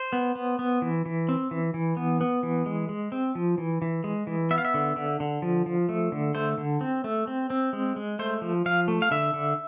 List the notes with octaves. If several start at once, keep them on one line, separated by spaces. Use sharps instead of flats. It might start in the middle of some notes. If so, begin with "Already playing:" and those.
Already playing: C5
B3
B3
B3
E3
E3
C4
E3
E3
B3
B3
E3
G#3
G#3
C4
F3
E3
E3
G#3
E3
B3 E5
F5
E5
D3
D3
D3
F3
F3
A3
D3
A3 C5
D3
C4
A3
C4
C4
G#3
G#3
A3 C5
F3
F3 F5
A3
F5
D3 E5
D3